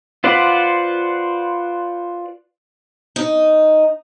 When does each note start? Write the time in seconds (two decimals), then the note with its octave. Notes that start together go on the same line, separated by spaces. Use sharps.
0.24 F4 B4 C5 D5 F#5
3.16 D#4